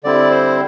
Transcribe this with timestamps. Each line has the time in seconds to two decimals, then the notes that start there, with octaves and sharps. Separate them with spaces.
0.04 D3 G3 C4 E4 D5
0.31 C5